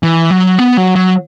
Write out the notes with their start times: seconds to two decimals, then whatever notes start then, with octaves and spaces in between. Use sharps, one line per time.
0.03 E3
0.31 F#3
0.59 B3
0.77 F#3
0.96 F#3